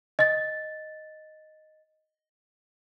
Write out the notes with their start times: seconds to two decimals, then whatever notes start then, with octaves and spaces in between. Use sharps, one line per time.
0.19 D#5 A6